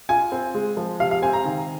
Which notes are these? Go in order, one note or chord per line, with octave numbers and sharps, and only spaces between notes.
F4 G#5
C4
G#3
F3
C3 F5
F5
C4 G#5
A#5
D#3